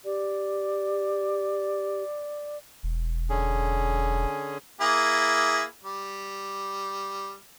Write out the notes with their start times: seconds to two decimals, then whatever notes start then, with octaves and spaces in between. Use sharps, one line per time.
0.05 G4 D5
2.83 E1
3.30 D3 C#4 G#4
4.81 A#3 E4 G#4
5.84 G3